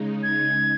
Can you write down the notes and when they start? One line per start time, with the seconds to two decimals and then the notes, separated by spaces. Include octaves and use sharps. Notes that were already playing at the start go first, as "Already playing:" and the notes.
Already playing: C#3 G#3 D#4
0.23 G#6